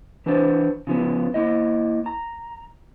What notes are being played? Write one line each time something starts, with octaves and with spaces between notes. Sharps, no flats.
E3 D4 B4 C5 A5
C#3 F3 B3
A#3 E4 D#5
A#5